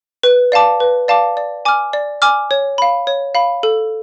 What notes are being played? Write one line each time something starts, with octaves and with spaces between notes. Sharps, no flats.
B4
D5 F5 A5 D6
B4
D5 F5 A5 D6
D5
G#5 D6 F6
D5
G#5 D6 F6
C#5
F5 B5
C#5
F5 B5
A4